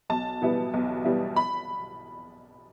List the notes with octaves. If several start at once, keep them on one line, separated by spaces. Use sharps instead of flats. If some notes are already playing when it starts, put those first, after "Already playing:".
B1 A5
B2 G3 B3 E4
B1
B2 G3 B3 E4
B5